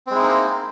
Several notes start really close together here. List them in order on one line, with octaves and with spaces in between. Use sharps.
C4 G#3 E4 D#4 A#3